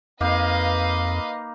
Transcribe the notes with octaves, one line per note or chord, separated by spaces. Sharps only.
F2 A#3 D#4 B4 D#5 F5